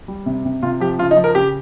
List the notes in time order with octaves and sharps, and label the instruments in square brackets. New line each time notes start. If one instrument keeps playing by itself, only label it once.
[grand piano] G3
C3
C3
C3 F4
F3 G4
C#3 F4
D#4
F3
A#4
C#3 G4